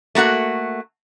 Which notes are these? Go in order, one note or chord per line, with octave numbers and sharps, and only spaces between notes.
A3 A#3 F#4 F#5